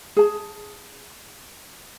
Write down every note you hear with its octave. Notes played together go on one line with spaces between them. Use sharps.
G#4 A5